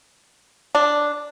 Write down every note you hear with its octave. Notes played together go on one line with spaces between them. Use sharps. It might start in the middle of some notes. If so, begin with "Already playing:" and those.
D4